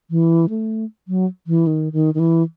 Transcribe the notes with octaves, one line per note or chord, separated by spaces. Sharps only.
E3
A3
F#3
E3
D#3
D#3
D#3
E3